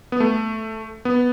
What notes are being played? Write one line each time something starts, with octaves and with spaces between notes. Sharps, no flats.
B3
A3
B3